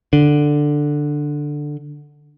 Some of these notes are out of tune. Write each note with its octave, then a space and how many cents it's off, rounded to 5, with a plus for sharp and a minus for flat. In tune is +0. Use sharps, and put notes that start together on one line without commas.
D3 +5